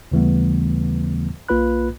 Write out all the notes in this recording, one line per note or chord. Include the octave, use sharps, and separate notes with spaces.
D#2 C#3 E3 G3 A3 B3
B1 A#3 F4 B4 B5 F#6